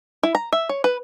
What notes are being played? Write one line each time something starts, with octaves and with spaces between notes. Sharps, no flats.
E4
A#5
E5
C#5
B4